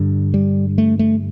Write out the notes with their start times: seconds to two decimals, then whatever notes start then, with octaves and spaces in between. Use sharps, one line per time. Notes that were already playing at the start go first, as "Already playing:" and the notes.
Already playing: G2 D3
0.34 G3
0.78 A3
0.99 A3